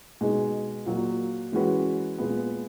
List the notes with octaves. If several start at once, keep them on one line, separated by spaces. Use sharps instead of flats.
B2 G#3 D#4 G#4
A#2 F#3 A#3
E3 G#3 C#4 F#4 B4
A#2 G#3 B3